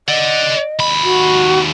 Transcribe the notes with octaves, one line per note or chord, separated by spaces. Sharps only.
D5 D#5 F#5
D#2 B5
F#4